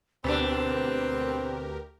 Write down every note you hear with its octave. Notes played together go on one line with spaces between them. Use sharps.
D2 B2 C4 D4 G4 A#4 B4